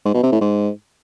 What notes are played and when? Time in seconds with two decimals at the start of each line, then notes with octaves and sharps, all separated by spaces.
0.05 G#2
0.14 B2
0.23 C3
0.32 A2
0.41 G#2